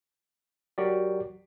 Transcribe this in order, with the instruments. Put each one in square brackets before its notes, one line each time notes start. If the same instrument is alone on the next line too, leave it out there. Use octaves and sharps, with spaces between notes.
[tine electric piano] F#3 F#4 G4 A#4 D5